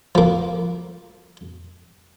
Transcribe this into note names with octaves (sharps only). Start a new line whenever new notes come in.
F3 A#3